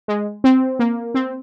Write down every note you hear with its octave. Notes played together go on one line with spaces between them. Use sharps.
G#3
C4
A#3
C4